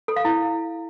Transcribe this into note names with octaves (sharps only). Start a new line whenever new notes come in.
A4
F5
E4